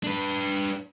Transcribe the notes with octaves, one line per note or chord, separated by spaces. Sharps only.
D4 B4